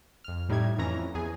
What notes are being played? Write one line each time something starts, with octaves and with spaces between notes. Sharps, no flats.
F2 F6
A2 G3 D#4 E4 G#6
F2 E3 C#4 A#5 A#6
E2 G#4 G#5